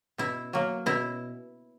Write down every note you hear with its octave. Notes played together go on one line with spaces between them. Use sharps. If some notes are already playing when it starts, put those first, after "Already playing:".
B2 E4
F#3 A#3
B2 E4